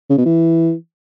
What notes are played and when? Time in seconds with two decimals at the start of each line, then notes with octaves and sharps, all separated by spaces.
0.10 C#3
0.18 B2
0.26 E3